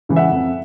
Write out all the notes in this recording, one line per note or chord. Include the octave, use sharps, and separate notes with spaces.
C#3 E3
E5 F#5
F2